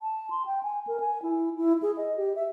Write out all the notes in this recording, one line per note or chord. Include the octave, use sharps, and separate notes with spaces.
A5
C6
G5
G#5
A#4
G#5
E4
E4
G#4
D#5
G4
E5